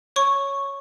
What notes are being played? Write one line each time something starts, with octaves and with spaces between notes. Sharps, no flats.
C#5 C#6